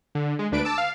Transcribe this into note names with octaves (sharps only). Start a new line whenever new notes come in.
D3
G#3
D2 D4 B4 D7
A5 D6 E6
F5